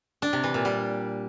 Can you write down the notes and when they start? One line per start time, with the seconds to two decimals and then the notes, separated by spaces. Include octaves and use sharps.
0.22 D4
0.33 C3
0.44 E3
0.54 A#2
0.65 G3